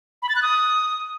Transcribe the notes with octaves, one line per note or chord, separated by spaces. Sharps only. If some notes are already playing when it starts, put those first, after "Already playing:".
B5
A6
F#6
D#6